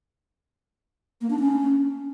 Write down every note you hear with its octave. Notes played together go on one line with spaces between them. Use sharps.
A#3
D4
C#4